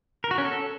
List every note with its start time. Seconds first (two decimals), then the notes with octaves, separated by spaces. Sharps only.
0.24 A#4
0.31 F#4
0.38 C#4
0.45 A4